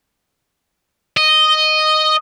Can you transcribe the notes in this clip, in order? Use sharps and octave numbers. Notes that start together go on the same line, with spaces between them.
D#5